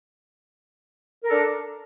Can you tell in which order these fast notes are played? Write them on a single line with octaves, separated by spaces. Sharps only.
A#4 A4 D4